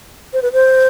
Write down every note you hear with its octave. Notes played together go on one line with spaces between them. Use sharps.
C5
B4
C5